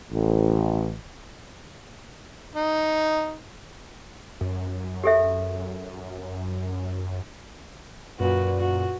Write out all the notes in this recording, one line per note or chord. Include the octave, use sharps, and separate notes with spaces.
A1
D#4
F#2
G4 A4 E5
F#2 A#2 F#4 B4
F#4